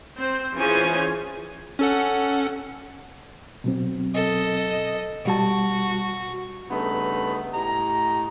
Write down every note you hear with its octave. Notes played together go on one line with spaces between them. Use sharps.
C4 C5
E3 C#4 F4 G#4 C5 G#5
C#4 A4 F#5
B2 F#3 C4
A4 D#5
B2 G3 F#4 A5
G2 C#3 A3 B3 D#4 B5
A2 G4 D#5 A#5